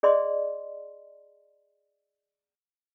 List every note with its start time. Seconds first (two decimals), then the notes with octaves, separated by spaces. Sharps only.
0.03 G#4 D5 D#5 C6